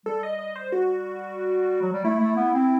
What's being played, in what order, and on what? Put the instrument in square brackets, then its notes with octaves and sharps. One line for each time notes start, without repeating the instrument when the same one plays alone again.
[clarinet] G3 [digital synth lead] A4
[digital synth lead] D#5
D#5
C5
F#4
[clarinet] F#3
G3
[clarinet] A3 [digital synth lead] E4
[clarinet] A3
B3
C4